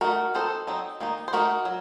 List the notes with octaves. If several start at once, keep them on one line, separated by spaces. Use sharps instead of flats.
A3 D#4 F#4 A#4
F3 C4 D#4 A4 C5
F#3 C4 D#4
D#3 A#3 D#4
C5
A3 D#4 F#4 A#4
F#3